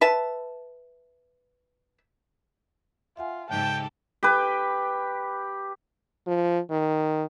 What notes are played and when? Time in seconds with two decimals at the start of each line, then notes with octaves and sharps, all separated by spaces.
0.01 B4 E5 A5
3.17 F4 E5 F#5 G#5
3.50 G#2 C#3 G4 A4 G5 A5
4.23 G4 B4
6.27 F3
6.71 D#3